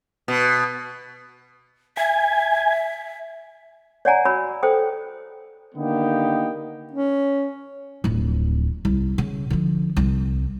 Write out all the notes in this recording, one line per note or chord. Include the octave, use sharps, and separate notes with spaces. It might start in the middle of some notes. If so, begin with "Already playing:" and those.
B2
E5 G#5
C#5 D5 F#5 G#5 A#5
F#4 C#5 B5 E6
A4 C5 G5 D#6
D3 D#3 A#3 B3 D#4 G4
C#4
D1 F2
C2
C#3
D3 F3
C2